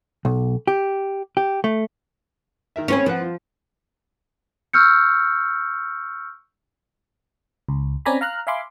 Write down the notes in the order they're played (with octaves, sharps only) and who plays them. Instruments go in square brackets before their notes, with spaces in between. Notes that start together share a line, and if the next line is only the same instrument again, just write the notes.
[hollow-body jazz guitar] B1
G4
G4
A3
[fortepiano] D#3 A#4 E5
[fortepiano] A3 C4 G#5 [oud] C#4 B4 C#5
[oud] F3 [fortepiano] C4 B4 F#5
[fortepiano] F4
[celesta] C#6 E6 F6 G6 C#7
[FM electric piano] C#2
C4 C#4 D5 G#5 A#5 B5
F5 A#5 F6 F#6
E5 F5 G#5 B5 C6 D6